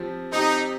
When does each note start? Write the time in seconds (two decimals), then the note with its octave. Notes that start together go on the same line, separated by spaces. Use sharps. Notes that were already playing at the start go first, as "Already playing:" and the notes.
Already playing: F3 C4 G4
0.32 C4 D#4 G4